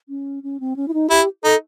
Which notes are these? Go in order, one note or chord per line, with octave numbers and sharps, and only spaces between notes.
C#4
C#4
C4
C#4
E4
D#4
E4 G4
D#4 A4